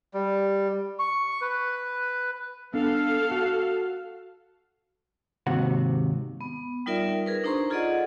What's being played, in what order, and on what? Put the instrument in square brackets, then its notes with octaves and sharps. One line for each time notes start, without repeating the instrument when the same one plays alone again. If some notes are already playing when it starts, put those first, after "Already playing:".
[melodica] G3
C#6
B4
[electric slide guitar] B3 D4 [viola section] A4 F5
[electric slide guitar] F#4 F#5
[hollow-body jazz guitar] D#2 G#2 C3 F#4 F#5
[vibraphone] B3
G3 D#4 F4 A#4 D5 E5
G#4 A#4 B4
D4 D#4 C5 A#5 C6 C#6
F4 G#4 A4 D5 D#5 F#5